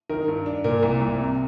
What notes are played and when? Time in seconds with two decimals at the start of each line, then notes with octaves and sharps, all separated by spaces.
0.09 D#3 A#4
0.28 G2
0.46 D4
0.64 A#2 A#4
0.83 C2
1.01 C2
1.19 C3